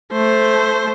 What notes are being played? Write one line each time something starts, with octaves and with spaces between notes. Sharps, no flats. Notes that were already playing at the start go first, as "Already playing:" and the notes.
A3 C5